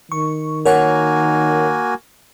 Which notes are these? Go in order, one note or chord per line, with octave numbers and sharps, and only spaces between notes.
D#3 C#6
A#3 F#4 A#4 C#5 F#5 G#5